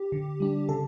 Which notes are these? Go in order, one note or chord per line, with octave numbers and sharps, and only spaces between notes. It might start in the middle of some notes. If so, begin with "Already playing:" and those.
Already playing: G4
D3
G3 D4
C#3 A4